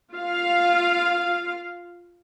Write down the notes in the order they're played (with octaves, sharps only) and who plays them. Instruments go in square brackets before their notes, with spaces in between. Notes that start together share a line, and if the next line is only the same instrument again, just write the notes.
[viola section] F4 F5